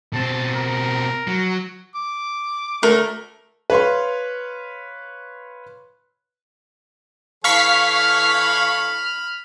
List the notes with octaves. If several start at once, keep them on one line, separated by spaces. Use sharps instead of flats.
B2 C4 A5
A#4
F#3
D6
A3 A#4
B4 C#5 F5 C6
E3 A4 C#5 F5 B5 C#6 F6 B6